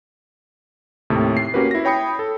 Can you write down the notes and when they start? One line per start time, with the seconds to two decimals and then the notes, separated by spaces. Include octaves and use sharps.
1.10 D#2 A2 C3
1.37 C7
1.54 A#3 C#4 F#4 G4 A#4 B4
1.71 E4 A#6
1.85 C#5 G5 B5 D#6 C#7
2.19 A4